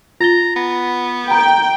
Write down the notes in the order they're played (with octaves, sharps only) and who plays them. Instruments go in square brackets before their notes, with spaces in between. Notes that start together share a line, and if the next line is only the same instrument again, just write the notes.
[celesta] F4 A6 G7 [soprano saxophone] A#5
[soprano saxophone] B3
[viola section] G5 [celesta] A#5